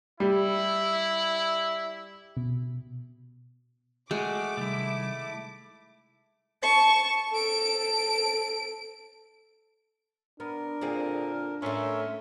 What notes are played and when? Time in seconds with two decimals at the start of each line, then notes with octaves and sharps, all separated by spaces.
0.20 G3 E4
2.37 B2
4.11 G#3 A3 F#4 D6
4.57 C3 D#3 G3 A3 E4
6.62 A5 C#6
7.31 A4 D7
10.40 B3 D4 A#4
10.81 A#2 D3 C4 G#4
11.62 A2 A3 C#4 A#4 E5 C6